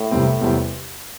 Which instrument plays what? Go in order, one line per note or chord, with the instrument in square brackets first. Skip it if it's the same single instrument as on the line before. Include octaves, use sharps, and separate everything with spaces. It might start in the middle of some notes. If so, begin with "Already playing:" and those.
Already playing: [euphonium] A2
[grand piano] C2 C3 E3 G3 C4
E2 C3 G3 C4